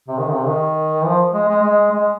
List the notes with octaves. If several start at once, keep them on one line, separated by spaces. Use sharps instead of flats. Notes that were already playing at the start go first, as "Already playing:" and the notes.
C3
D#3
C3
D#3
F3
G#3
G#3
G#3
G#3